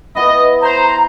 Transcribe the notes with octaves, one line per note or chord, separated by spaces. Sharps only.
B3 E4 D#5
C5 A#5